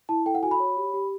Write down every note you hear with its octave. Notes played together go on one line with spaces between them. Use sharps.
E4 A5
A4 G5
F#5
F#4 G#5
B5
C#5
G4
G4